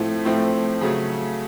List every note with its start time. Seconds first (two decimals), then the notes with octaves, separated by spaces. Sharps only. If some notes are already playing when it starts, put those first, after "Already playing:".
Already playing: A2 F3 A3 C4 E4
0.25 A2 F3 A3 C4 E4
0.81 C#3 F#3 A3 G#4